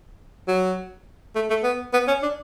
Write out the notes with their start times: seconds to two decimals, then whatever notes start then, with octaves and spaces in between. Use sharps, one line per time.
0.48 F#3
1.35 A3
1.50 A3
1.63 B3
1.93 B3
2.08 C#4
2.22 D4